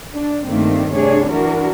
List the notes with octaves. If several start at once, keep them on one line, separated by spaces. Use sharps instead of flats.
D4
G2 D#3 A3 A#3 C4 D4
C3 D4 G#4 C#5
E3 D4 F#4 A#4